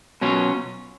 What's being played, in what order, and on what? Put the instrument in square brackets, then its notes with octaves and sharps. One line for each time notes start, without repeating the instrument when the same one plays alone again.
[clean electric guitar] B2 F#3 C#4 F4